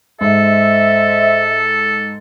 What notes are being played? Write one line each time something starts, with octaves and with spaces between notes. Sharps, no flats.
G#2 A4 C5 D#5 E5